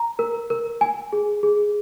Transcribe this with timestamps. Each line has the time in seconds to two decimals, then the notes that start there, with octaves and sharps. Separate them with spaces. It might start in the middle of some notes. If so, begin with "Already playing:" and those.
Already playing: A#5
0.19 A#4
0.50 A#4
0.81 G#5
1.13 G#4
1.43 G#4